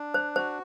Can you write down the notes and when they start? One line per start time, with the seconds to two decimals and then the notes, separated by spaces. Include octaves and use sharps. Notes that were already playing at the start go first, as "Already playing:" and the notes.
Already playing: D4
0.14 C5
0.36 F#4 C5